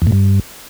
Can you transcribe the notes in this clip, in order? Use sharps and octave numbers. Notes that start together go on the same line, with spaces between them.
E2
A2
G2